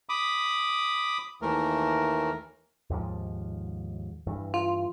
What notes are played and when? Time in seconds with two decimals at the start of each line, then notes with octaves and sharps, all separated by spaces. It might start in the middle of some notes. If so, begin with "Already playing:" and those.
0.09 B5 D6 D#6
1.42 D#2 E3 A3 A#4
2.90 D#2 G#2 F3
4.27 G2 E3
4.54 F4